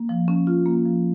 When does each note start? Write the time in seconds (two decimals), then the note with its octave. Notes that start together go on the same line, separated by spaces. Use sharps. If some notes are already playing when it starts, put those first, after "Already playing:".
Already playing: A#3
0.09 F3
0.28 C#4
0.47 F4
0.66 A#3
0.85 F3